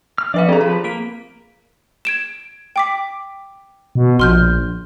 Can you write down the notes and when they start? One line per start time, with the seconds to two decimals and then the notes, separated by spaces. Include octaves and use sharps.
0.18 F6
0.34 F3 B3 B4 D5 F5
0.49 C4 G4 G#4 A#5
0.61 F3 G#4 B4
0.84 A#3 B6 D7
2.05 G#6 D7 E7
2.76 G5 D6 B6
3.95 B2
4.20 A#1 C6 F6 G6